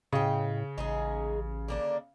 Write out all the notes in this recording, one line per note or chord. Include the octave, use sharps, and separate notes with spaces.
A2 C#3 D#5 G5
A1 G#3 D#4 G#4
D3 A#3 D4